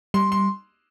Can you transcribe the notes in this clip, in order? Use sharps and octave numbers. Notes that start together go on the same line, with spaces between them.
G3 C6
C6